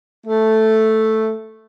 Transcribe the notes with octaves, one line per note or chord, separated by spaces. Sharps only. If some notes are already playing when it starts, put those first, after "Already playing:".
A3